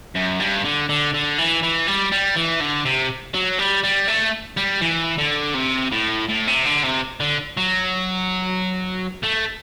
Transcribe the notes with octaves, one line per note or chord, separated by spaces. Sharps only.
F#2
G2
D3
D3
D3
E3
E3
G3
G3
E3
D3
C3
F#3
G3
G3
A3
G3
E3
D3
C3
A2
A2
C3
D3
C3
D3
F#3
A3